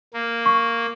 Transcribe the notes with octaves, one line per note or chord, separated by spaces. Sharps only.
A#3
C#6